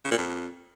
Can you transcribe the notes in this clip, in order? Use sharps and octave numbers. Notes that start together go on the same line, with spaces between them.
C#3
A#2
F2